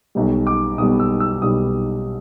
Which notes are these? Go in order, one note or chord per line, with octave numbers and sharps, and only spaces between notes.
B1 B2 G3
D6
B1 B2 G3 D#6
E6
E6
B1 B2 G3 D#6